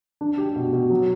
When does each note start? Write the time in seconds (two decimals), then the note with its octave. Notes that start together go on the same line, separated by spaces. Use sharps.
0.21 D4
0.38 G4
0.56 B2
0.73 B2
0.90 F#3